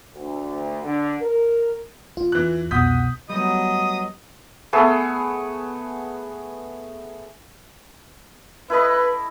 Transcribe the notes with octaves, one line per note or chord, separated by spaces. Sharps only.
D2
D3
A#4
E2 F4
E3 F#6
C2 F2 B2 F#5 D#6 G6 B6
F#3 G3 A3 B3 D#5 D#6
A3 B3 G#4
E4 A4 B4 D#5